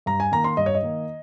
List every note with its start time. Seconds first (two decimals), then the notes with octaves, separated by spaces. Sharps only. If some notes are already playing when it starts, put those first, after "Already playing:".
0.06 G2 A#5
0.20 G#5
0.32 D#3 A#3 A#5
0.44 C6
0.57 G2 D#5
0.66 C#5
0.75 D#5
0.83 D#3 A#3